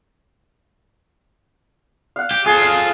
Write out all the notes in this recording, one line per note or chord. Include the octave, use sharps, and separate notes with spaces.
F5 F#5
G4
F4 G#4 A4
F5